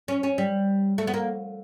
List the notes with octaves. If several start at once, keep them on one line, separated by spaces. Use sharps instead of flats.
C#4
C#4
G3
A3
B3
A#3